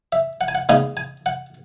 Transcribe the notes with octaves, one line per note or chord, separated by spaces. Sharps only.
E5
F#5
G#5
F#5
C#3 G#3 B3 D#4 G#5
G#5
F#5